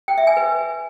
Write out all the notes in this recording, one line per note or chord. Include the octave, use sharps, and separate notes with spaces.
G5
E5
G#5
B4